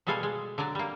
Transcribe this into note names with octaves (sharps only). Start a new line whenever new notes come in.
B2 G3 G#3 A4 F5 G#5
G#3
D3 F#3 D5 A#5
G3 A#3